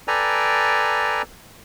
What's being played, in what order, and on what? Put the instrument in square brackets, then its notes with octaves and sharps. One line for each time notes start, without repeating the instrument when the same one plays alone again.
[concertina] A4 B4 D5 G5 G#5 A#5